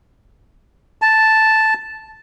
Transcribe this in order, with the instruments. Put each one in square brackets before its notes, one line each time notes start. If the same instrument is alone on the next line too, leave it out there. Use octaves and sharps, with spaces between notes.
[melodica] A5